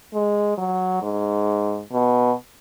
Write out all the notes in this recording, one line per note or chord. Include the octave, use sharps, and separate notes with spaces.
G#3
F#3
G#2
B2